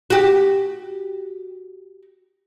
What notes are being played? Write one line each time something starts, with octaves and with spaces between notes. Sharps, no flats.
F#4 G4